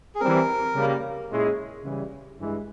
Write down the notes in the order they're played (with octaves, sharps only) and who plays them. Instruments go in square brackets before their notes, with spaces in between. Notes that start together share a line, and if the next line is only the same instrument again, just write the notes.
[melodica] G#4
[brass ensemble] E3 G3 C4 [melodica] A#4
[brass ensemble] C#3 G3 A#3
A#2 G#3 C#4 E4 G#4
C#3 E3 G3
G2 E3 G#3